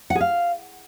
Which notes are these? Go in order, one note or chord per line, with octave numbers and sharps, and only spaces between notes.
F#5
G#4
F5